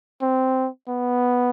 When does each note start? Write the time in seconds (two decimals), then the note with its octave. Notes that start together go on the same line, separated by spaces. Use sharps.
0.22 C4
0.88 B3